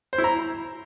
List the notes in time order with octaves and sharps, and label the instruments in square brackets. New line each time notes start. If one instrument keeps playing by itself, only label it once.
[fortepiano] C5
E4
A#5